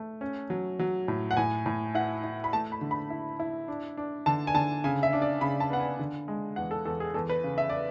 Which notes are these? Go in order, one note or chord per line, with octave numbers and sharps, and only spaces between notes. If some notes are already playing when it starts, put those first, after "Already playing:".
Already playing: A3
C#4
F#3
F#3
A2
F#5
A2 G#5
A2
E4 F#5
E4
B5
A3 A5
B5
D3
B5
E4
E4
D4
D4
D3 A5
G#5
D3 A5
C#3 G#5
E5
D4
D5
C#3 B5
A5
B3 F#5
G#5
D3
G#3
E2 F#5
A4
E2 A4
G#4
E2 A4
B4
C#3
E5
D5